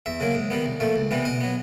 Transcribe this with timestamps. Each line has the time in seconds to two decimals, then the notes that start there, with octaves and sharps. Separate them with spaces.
0.06 E2 E5
0.20 C#3 F#3 A#3
0.35 G#2
0.50 D#3 G3 B3
0.66 C2
0.80 A#2 F3 A3
0.96 C#2
1.11 C3 E3 G3 B3
1.25 B2 D#5
1.41 F#3 B3